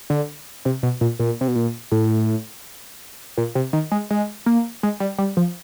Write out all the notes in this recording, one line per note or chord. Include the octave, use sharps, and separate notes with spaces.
D3
C3
B2
A#2
A#2
C3
B2
A#2
A2
A#2
C3
D#3
G#3
G#3
A#3
G#3
G3
G3
F3